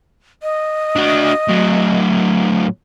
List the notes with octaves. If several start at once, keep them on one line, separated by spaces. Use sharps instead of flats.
D#5
D4 F#4
A2 F#3